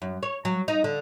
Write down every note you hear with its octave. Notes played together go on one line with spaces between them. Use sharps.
F#2
C#5
F#3
D#4
D3